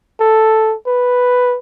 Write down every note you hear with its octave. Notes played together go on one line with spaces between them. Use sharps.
A4
B4